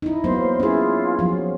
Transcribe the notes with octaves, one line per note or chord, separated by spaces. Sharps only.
D#4 E4
F#3 A#3 B3 C5 C6
C#4 E4 F4 G#4
F3 F#3